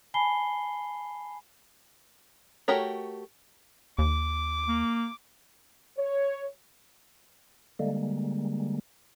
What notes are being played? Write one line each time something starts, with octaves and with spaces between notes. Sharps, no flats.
G#5 A5 B5 C7 G7
A3 F#4 G4 A#4 C#5
D#2 D6
A#3
C#5
D3 G3 G#3 A#3